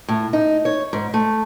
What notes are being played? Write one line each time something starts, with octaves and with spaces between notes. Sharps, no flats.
A2
D#4
C#5
G#2
A3